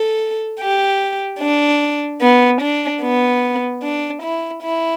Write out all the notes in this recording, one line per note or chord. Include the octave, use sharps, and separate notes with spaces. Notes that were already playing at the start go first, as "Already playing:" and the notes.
Already playing: A4
G4
D4
B3
D4
B3
D4
E4
E4